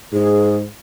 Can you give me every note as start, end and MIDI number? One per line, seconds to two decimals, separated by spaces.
0.13 0.66 44
0.13 0.56 68